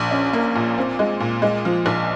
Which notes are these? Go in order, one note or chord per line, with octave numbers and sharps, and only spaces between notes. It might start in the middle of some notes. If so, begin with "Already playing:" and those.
Already playing: A#1
C#4
A#3
A#2
C4
G#3
A#2
G#3
F3
A#1